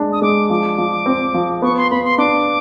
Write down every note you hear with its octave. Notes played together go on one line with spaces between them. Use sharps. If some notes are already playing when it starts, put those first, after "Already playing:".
Already playing: G#3 D4
D#6
G#3 D6
F3 D6
F3
C4
F3
B3 C#6
C6
B3 B5
C6
D4 D6